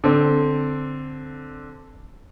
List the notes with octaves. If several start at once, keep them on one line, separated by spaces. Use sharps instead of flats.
D3 C4